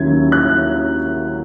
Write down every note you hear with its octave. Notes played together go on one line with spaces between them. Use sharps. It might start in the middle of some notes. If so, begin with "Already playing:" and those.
Already playing: D#2 D#3 F#3 C#4 E4 G#6
F#6